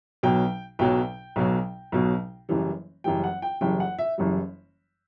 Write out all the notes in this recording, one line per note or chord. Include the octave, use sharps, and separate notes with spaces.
B1 B2 F#3 G5
B1 B2 F#3 G5
B1 B2 F#3
B1 B2 F#3
F#1 F#2 E3 G3
F#1 F#2 E3 G3 G5
F#5
G5
F#1 F#2 E3 G3 G5
F#5
E5
F#1 F#2 E3 G3